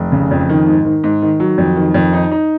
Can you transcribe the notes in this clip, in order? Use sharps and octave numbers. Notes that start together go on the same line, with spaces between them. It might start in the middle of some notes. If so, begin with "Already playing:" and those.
Already playing: F1
C#3
F2
D#3
G#2
D#3
G#2
D#3
F#3
F2
D#3
F2
D#4
D#4